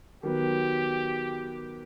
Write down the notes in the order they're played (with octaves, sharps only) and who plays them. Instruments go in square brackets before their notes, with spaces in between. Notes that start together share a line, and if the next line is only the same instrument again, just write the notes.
[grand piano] D#3 F#3 B3 [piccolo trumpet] G4